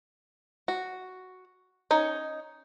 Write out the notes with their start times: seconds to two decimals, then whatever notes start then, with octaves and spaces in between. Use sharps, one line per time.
0.68 F#4
1.91 C#4 D#4 C#5